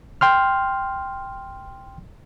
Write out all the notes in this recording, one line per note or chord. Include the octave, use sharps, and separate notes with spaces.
G5 C6 F6